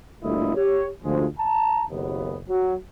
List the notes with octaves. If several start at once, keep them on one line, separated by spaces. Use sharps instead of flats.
G1 D2 A#2 A3 E4 D#5
G4 C#5
D2 F3 G#3
A5 A#5
F#1 D#2 B3
F#3